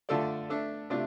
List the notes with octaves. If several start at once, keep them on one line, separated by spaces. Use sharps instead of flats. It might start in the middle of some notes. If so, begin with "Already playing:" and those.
D3 A3 F4 A4 D5
A3 D4 A4
C3 A3 D4 F4 D5